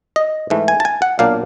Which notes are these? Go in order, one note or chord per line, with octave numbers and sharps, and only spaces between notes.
D#5
G#2 E3 A3
G#5
A5
G#5
F#5
B1 A#2 F#3 A#3 D4 F5